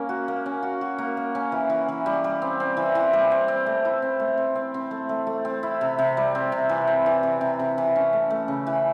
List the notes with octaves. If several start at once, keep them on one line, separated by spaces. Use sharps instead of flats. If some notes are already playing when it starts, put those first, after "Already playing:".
Already playing: A#3 C#4
F#4
A#3
C#4
F#4
F#4
A#3
A#3
C#4
E3
E3
E3
G3
G3
C4
C4
E3
E3
G3
C4
C4
A3
E4
C4
A3
C4
C4
C4
A3
A3
A3
C4
E4
C3
C3
G3
C4
C3
E3
C4
E3
C3
C3
C3
E3
C#4
A3
A3
C#3
E3